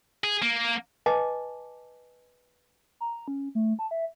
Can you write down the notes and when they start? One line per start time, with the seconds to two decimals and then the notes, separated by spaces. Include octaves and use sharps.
0.24 G#4
0.42 A#3
1.06 B4 D#5 G#5 A5 D6
3.01 A#5
3.28 C#4
3.55 A3
3.79 A5
3.91 E5